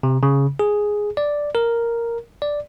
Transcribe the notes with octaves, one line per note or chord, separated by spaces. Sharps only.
C3
C#3
G#4
D5
A#4
D5